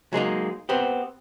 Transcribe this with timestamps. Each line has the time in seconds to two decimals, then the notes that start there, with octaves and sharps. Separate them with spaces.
0.13 F#3 G#3 A#3 D#4
0.69 B3 C4 G4